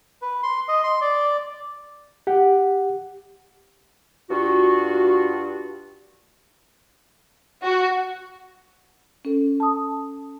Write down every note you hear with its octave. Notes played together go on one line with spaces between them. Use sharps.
B4
C6
D#5
C6
D5
G4 F#5
G2 F4 F#4
F#4
C#4 A4
A5 D#6